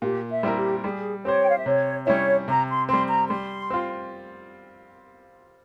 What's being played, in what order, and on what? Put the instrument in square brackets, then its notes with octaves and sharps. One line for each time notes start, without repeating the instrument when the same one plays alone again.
[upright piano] A#2 [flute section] G4
[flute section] E5
[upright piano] G3 C4 E4 A#4
[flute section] G4
[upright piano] G3 [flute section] G#4
[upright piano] C4 G4 C5 [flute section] C#5
[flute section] G5
F5
E5
[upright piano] C3 [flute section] C#5
[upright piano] G3 C#4 E4 [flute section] C#5
[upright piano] C3 [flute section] A#5
[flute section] C6
[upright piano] G3 C4 [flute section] C6
[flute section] A#5
[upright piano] G3 [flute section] C6
[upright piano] C4 F4